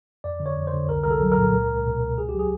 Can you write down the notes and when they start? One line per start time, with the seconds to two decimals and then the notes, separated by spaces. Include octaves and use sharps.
0.24 F2 D5
0.40 D3
0.46 C#5
0.56 F2
0.67 C5
0.73 D3
0.89 C2 A#4
1.03 C2 A#4
1.10 A4
1.21 F#3
1.32 A#4
1.37 A#2
1.53 C#2
1.69 C#2
1.86 B2
2.02 C#2
2.18 D#2 G#4
2.29 G4
2.34 F#3 G#4